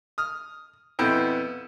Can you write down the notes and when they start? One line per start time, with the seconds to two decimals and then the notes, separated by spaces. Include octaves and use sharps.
0.18 D#6 F6
0.99 F2 B2 B3 E4 G5